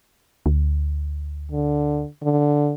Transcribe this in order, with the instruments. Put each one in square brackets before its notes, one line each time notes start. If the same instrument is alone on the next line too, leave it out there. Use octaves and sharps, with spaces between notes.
[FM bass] D2
[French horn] D3
D3